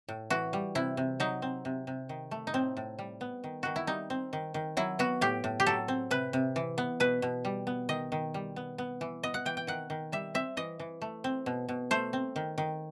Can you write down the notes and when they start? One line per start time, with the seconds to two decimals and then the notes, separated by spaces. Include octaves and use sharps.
0.09 A2
0.30 E3 F#4
0.53 G3
0.75 C3 E4
0.97 C3
1.20 F#3 D#4
1.42 C4
1.65 C3
1.87 C3
2.09 D#3
2.31 A3
2.47 D#4
2.54 A2 C4
2.77 A2
2.99 G3
3.21 B3
3.44 D#3
3.63 D#3 F#4
3.76 E4
3.87 G3 D#4
4.10 C4
4.33 D#3
4.54 D#3
4.77 F#3 E4
4.99 B3 F#4
5.21 A2 G4
5.44 A2
5.60 G4
5.66 F#3 A4
5.88 C4
6.11 C3 B4
6.33 C3
6.56 E3
6.78 B3
7.00 B2 B4
7.22 B2
7.45 G3
7.67 B3
7.89 D#3 D#5
8.12 D#3
8.34 G3
8.56 B3
8.78 B3
9.01 E3
9.23 B3 D#5
9.34 F#5
9.46 E3 G5
9.57 G5
9.67 D#3 F#5
9.90 D#3
10.12 G3 E5
10.35 C4 E5
10.57 E3 D#5
10.79 E3
11.02 A3
11.24 C4
11.46 B2
11.68 B2
11.91 A3 C5
12.13 C4
12.36 D#3
12.58 D#3